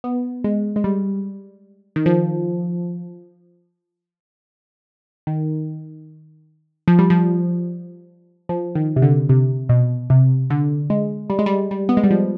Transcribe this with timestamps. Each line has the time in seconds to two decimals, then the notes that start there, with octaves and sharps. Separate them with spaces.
0.04 B3
0.44 G#3
0.76 G#3
0.84 G3
1.96 D#3
2.06 F3
5.27 D#3
6.88 F3
6.99 G3
7.10 F3
8.49 F3
8.75 D#3
8.96 C3
9.02 D3
9.29 C3
9.69 B2
10.10 C3
10.50 D3
10.90 G#3
11.30 G3
11.39 G#3
11.46 G3
11.71 G3
11.89 B3
11.97 G#3
12.04 G3
12.11 F3